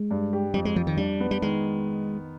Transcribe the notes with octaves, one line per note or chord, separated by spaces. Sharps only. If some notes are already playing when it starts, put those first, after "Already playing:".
Already playing: G#3
G2
G4
F2 G3
G#3
F2 F3
D#3
G3 D4
B3
G3
D#3 G#3